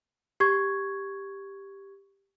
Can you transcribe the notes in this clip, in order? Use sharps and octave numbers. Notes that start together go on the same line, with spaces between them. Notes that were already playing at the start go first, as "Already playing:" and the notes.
G4 C#6 G#6